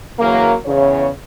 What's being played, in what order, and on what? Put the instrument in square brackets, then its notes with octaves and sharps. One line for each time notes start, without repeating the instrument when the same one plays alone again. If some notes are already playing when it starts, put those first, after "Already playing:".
[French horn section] C#3 E3 F#3 A#3
E2 C#3 C#5